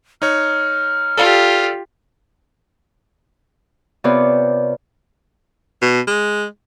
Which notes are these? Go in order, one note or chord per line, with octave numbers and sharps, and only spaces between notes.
D#4 C#5 F6
F4 G4 A4 D5 F5
C3 B3 F4 B4 C#5 D5
B2
G#3